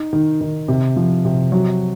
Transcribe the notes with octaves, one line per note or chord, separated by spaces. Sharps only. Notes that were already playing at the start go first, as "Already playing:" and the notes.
Already playing: D#4
D#3
D#3
C3
F3
C3
F#3